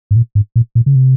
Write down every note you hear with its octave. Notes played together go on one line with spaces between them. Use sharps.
G#2
A#2
G#2
A#2
A#2
C#3
C3